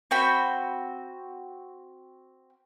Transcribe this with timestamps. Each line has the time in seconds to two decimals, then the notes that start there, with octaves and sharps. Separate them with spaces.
0.11 C4 F#4 G5 B5